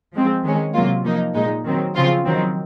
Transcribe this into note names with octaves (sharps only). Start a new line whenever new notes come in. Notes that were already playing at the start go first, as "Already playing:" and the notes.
F3 G#3 C4
D#3 G#3 C#4
C3 F#3 A#3 F4
F3 A#3 D#4
A#2 G#3 D#4
D#3 F#3 C4
C#3 F3 C4 F4
D#3 F#3 C4